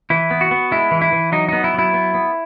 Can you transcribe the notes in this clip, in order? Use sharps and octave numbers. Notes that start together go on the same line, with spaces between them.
E3 E4
B3
F#4
B3
G#3 E4
E3
E4
E3
F#3 D#4
B3 D#4
E4
F#3 E4
B3
B3